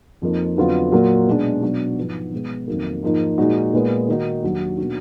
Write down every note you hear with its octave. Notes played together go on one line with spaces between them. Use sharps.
F2 F3 A#3 D#4
F2 D3 F#3 B3 F4
A#2 F#3 A#3 F4
B2 G#3 D4
B2 F#3 D4 F#4
G#2 F3 B3
B2 G#3 B3
F2 D#3 F#3 A#3
G#2 F3 A#3 D#4
A#2 G#3 D#4 F#4
A#2 G#3 B3
D#3 A#3 D#4 F#4
D#2 D#3 F#3 D4 F#4
B2 A#3 D4 F#4